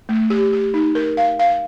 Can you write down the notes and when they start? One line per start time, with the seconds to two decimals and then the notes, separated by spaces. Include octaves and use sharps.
0.09 A3
0.30 G4
0.53 G4
0.74 D#4
0.95 A#4
1.17 F5
1.39 F5